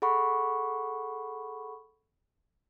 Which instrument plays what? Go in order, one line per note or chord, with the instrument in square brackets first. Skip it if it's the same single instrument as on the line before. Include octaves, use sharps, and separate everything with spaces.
[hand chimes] G#4 A4 F#5 B5 C#6